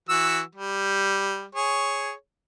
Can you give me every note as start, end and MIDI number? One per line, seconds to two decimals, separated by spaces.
0.09 0.41 52
0.09 0.41 66
0.09 0.41 88
0.55 1.44 55
1.55 2.12 68
1.55 2.12 73